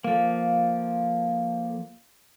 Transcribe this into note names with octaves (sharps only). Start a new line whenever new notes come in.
F3 A#3 A4 F5